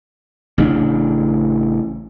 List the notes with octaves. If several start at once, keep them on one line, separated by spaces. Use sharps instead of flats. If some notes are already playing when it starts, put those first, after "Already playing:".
A1 C#3 C#4 D4